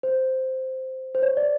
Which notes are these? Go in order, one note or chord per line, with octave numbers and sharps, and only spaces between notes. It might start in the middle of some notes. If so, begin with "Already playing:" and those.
C5
C5
C#5
D5